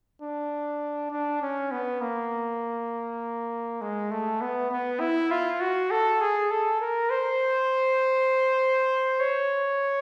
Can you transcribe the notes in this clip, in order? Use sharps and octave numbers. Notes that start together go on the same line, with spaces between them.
D4
D4
C#4
B3
A#3
G#3
A3
B3
B3
E4
F4
F#4
A4
G#4
A4
A#4
C5
C#5